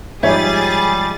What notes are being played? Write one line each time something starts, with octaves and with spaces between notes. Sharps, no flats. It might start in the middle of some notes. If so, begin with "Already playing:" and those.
G#2 F3 G3 D#4 G#4 C#5 E5 A6